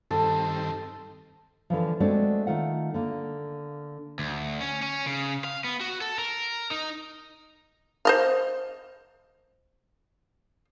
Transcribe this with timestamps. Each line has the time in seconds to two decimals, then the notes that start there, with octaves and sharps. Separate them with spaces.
0.11 G2 D#3 C4 A4
1.70 D3 E3 F3
2.00 G#3 A3 C4 D4 F#4 D5
2.47 D#3 A3 F4 F#5
2.94 D3 A#3
4.19 D2
4.61 C#4
4.82 C#4
5.07 C#3
5.44 F5
5.64 B3
5.81 F#4
6.01 A4
6.19 A#4
6.71 D#4
8.05 C5 D#5 F5